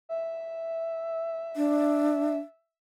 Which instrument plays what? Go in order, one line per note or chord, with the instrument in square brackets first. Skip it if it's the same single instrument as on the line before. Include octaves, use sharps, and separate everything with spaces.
[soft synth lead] E5
[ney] D4